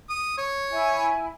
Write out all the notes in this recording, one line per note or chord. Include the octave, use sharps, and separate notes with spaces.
D#6
C#5
E4 G#5